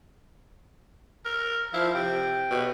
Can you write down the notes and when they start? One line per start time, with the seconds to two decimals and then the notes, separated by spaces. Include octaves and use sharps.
1.25 A#4
1.73 F3 E4 F5
1.94 C3 G5
2.51 B2